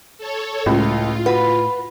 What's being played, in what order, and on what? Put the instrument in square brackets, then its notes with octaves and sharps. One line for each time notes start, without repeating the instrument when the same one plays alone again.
[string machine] A4 C#5
[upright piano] C#2 [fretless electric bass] A2 [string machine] F4
[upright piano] F#4 [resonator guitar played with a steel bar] B4